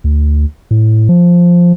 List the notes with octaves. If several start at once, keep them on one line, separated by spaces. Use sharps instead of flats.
D2
A2
F3